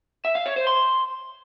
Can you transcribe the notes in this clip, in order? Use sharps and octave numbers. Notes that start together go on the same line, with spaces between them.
E5
F5
C#5
C5
C6